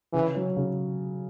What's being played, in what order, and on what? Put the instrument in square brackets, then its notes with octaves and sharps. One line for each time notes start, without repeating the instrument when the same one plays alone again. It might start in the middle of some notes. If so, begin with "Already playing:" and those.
[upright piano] C#3 [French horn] E3
[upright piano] F#3 C#4
C#3